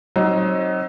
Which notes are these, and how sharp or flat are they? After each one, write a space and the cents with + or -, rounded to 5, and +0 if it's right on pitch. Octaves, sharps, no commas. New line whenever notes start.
F#3 +25 C4 +40 D#4 +15